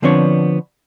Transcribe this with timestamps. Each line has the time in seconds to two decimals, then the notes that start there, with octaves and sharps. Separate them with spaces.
0.02 D3 F3 B3 C4 D4 C#5